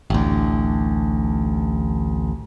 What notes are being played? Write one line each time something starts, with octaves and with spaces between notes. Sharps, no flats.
A1 D2